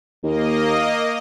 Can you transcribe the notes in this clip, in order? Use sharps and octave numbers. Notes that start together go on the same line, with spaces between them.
D#2 A#3 D#5